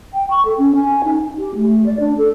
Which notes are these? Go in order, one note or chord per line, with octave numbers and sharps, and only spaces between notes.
G5
C#6
A4
C#4
G#5
D#4
G4
A3
D5
D4
A4